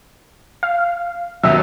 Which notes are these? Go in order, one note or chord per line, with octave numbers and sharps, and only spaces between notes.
F5
D#2 B2 F#3 E5